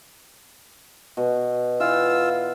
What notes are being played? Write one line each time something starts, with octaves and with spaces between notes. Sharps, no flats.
B2
E3 F4 F#5 E6